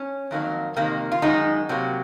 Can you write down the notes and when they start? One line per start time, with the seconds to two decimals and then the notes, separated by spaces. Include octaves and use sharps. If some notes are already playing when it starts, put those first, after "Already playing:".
Already playing: C#4
0.31 F2 D#3 F#3 A#3
0.76 F2 C3 D#3 A#3
1.12 F4
1.22 F#2 D#3 G#3 D#4
1.69 C3 F#3 A#3